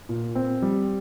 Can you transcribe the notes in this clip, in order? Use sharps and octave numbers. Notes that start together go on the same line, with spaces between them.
A#2
C4
G3